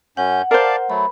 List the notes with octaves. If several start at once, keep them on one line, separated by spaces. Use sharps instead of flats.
F#2 C#4 F#5 G6
A#4 C5 D5 F5 A5
F#3 A3 B5